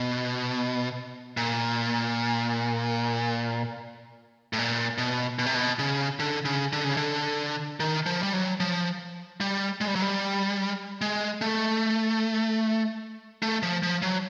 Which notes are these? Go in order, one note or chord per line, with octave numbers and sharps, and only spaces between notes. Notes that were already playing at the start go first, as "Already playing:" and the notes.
Already playing: B2
A#2
A2
A#2
B2
B2
C3
B2
C#3
D3
C#3
D3
C#3
D3
D#3
F3
G3
F#3
F3
G3
G#3
G3
F#3
G3
G#3
A3
A3
F3
F3
F#3